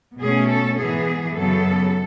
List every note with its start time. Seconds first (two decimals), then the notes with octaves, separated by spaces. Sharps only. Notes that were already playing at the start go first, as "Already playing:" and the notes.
0.19 B2 A3 C#4 G#4
0.49 A4
0.78 G#2 E3 B3 G#4
1.37 F#2 C#3 F#3 B3 A4